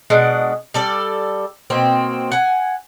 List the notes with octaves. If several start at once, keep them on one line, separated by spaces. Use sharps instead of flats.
B2 G#3 D4 F#5
G3 A4 D5
B2 A#3 C4
F#5 G#5